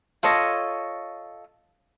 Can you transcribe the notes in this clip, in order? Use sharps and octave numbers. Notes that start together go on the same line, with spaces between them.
F4 A4 C#5 D#5